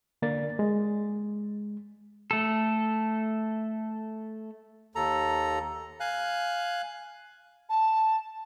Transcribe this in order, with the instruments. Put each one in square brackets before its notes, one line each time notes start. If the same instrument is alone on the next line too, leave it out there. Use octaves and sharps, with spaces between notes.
[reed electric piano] D3 A#3 D5 A6
G#3
[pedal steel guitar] A3 A4
[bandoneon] D#2 A4 A#5
F5 G#5 F#6
[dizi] A5